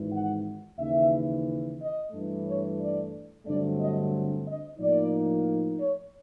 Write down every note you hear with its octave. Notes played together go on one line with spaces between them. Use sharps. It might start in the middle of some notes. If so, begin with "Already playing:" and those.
Already playing: G#1 G#2 E3
F#5
D#2 C#3 E3 E5
D#5
G2 E3 A3
C#5
D5
G2 D3 F#3 A3 C4 D5
D#5
D#5
A2 F3 A#3 D#4 D5
C#5